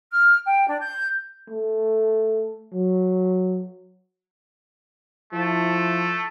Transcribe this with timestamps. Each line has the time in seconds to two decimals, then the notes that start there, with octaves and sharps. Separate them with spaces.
0.13 F6
0.46 G5
0.68 D4
0.81 G6
1.50 A3
2.73 F#3
5.33 F3 A3 E4 F4